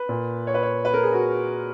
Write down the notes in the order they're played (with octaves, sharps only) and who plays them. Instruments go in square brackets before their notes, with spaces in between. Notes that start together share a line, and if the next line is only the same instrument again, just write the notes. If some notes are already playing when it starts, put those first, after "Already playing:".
Already playing: [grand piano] B4
A#2
C#5
B4
C#5
B4
A#4
G#4
F#4